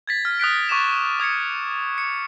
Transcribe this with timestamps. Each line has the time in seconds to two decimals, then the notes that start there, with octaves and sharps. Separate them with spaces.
0.07 G#6 A6 B6
0.25 F6
0.40 D#6 F#6 B6 D7
0.69 C#6 D6 A6 E7
1.20 D#6 G#6 B6 C#7
1.98 C#7